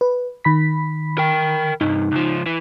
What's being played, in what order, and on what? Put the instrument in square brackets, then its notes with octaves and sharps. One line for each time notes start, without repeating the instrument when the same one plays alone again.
[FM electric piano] B4
D#3 B5 B6
[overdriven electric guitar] A#4 G5
[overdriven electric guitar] C2 G2 [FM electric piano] D#4
[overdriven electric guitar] C#2 F3
E3